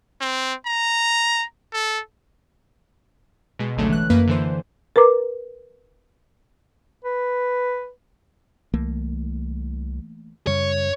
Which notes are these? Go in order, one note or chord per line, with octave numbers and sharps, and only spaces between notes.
C4
A#5
A4
B2 G#3
G#1 C#2 D3 F#3 A3 C#5
E3 F#6
F#2 A#3 B4
D3 E3 C5
A#4 B4 A#5 D6
B4
C2 E3 A3 A#3
F#2 C#3 G3 C#5